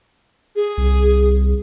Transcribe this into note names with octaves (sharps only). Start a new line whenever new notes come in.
G#4
C2